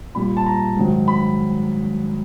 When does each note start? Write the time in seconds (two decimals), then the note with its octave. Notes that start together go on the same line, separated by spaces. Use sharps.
0.15 A#2 G3 B5
0.37 A5
0.46 A#5
0.77 G#2 D#3 F#3
1.08 B5